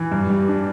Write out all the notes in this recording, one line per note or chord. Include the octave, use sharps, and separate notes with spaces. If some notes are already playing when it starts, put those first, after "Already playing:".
Already playing: E3
G2
G3
D4